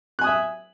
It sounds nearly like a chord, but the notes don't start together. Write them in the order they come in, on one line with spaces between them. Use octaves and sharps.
F#6 G#5 D#6 E5